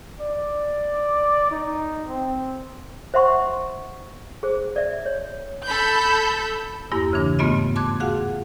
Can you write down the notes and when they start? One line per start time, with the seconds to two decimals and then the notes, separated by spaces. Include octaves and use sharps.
0.21 D5
1.51 D#4
2.06 C4
3.14 C5 E5 F#5 C6 C#6
4.43 G#4 C5
4.76 D5 E5
5.06 C#5
5.64 A4 B5 G6
6.92 E2 G2 A#3 E4
7.13 C#3 E3 D4
7.39 G#2 A3 B3 F4 D#5
7.76 A5 C6 D6 F#6 G#6
8.00 F4 F#4 G#4 F5 F#5